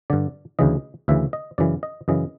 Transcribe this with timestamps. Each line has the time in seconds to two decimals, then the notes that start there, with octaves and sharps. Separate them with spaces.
0.10 G2 D3 D5
0.59 D2 C#3 E3 D#5
1.08 D2 C#3 E3 E5
1.33 D#5
1.58 F#2 C#3 E3 D5
1.83 D#5
2.08 F#2 C#3 E3 D#5